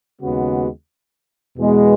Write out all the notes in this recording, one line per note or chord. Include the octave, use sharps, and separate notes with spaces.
D#2 C#3 G#3 B3 F#4
E2 B2 G#3 B3